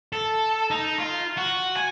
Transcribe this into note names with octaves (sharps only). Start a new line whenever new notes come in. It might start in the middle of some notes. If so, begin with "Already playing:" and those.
A4
D#4
F4
F#4
G#5